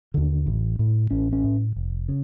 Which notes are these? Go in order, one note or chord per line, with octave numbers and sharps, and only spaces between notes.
D#2 D3
A1
A2
A1 C#4
C#4
A2
F1
C#3